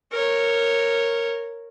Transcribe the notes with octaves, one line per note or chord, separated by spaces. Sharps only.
A#4 C#5